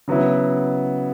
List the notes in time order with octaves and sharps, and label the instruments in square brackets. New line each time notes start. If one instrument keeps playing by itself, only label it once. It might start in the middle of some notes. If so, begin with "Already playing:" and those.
[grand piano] C#3 F#3 B3 E4